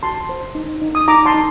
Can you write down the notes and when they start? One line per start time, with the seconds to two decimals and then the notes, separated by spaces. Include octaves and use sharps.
0.03 F#4 A5 C6
0.29 C5
0.55 D#4
0.82 D#4
0.95 D#6
1.08 D#4 A#5 D6
1.25 A5 C6
1.34 D#4